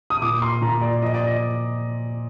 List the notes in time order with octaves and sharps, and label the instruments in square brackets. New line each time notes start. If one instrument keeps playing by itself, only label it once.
[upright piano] D#6
A#2 D6
C6
A#2 A#5
D5
F3 D#5
D5
D#5